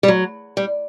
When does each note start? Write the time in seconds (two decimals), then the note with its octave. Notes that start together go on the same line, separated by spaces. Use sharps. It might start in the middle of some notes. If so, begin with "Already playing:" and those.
0.03 G3
0.08 F#3
0.57 G3